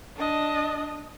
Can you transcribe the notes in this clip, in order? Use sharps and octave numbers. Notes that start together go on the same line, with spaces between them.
D4 D#5